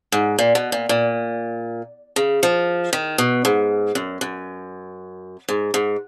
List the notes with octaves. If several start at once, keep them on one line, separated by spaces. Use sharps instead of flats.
G#2
A#2
B2
A#2
A#2
C#3
F3
D#3
B2
G#2
F#2
F#2
G#2
G#2